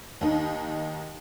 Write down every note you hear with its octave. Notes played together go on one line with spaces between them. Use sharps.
D#2 D#4